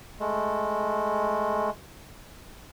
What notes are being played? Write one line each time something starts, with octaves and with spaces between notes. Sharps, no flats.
G#3 A3